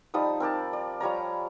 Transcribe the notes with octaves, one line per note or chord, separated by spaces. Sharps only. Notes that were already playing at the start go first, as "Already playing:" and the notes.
F3 G3 D#4 D#6
C4 A#4 D5 A5
D5
F3 G3 C#5 A#5